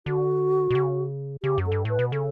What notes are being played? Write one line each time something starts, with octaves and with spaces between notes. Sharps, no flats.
D3 F#4
B2
C#3
C#3 G4
F#2
A4
G2
A2 B4
B2
C#3 A4